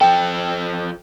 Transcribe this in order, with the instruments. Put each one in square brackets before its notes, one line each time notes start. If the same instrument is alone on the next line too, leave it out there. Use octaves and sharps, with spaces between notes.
[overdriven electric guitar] F3 A4 [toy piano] G5